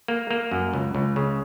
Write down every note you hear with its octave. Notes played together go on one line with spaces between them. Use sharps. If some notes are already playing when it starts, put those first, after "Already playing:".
A#3
A#3
F#2
C#2
C#2
C#3